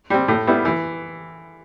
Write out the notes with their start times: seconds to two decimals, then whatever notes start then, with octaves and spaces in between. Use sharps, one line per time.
0.10 G3 C4
0.28 A2
0.47 G3 B3 E4
0.65 E3